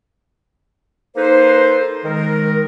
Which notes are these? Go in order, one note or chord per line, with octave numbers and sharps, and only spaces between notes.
A#3 D#4 A4 B4 C5
D#3 G#3 A#4